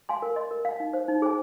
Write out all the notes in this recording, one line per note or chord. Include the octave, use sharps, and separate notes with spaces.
F5 G#5 C6
A#4
D#5 C6
A#4
F5 G#5
D#4
C5 F5
D#4
G#4 C5 G#5